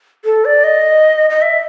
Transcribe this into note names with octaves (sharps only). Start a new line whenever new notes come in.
A4
D5
D#5
D#5
E5